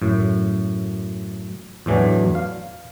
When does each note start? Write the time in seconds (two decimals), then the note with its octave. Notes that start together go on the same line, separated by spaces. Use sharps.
0.02 F#2 A2
1.86 E2 A2 E3 F#3 D4
2.35 F5